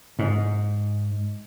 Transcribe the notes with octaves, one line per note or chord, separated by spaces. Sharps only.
G#2